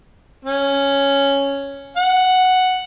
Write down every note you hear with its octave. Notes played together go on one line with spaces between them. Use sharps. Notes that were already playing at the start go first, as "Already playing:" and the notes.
C#4
F#5